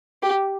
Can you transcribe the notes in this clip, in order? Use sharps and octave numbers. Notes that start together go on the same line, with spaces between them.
G4